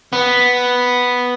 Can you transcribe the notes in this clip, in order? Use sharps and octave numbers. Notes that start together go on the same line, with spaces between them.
B3